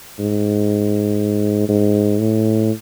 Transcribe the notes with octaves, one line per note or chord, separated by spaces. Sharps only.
G#2
G#2
A2